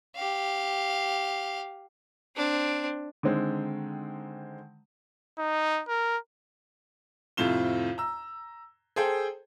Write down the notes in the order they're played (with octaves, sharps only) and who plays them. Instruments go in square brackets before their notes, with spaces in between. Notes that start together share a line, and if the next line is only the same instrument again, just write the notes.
[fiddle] G4 F5
C4 D4
[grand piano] D3 D#3 G#3 C4
[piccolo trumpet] D#4
A#4
[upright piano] F2 A2 C3 F4 E7 G7
A#5 E6
G#4 A4 C5 G5